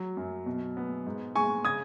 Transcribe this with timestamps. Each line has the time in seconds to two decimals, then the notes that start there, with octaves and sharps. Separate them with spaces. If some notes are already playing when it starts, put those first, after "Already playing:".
Already playing: F#3
0.17 F#2
0.46 B2
0.77 B3
1.06 G#2
1.35 G#3 G#5 C#6
1.65 C#3 D#6 G#6